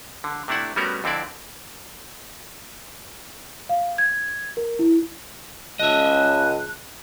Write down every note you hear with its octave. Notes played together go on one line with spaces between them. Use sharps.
D3
C3 A3 D4 E4 F#5
G3 A3 B3 C#4 F#4 A#4
F2 D3 C4 E4 D5
F5
G#6
A#4
E4
C#2 D#5 E5 A5 F#6